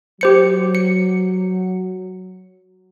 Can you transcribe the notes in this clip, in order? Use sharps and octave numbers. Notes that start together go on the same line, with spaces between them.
F#3 G4 C5 C#7
C#7